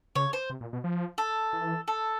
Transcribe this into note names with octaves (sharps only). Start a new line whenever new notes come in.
C#3 C#5
C5
C3
A#2
B2
F3
A4
E3
A4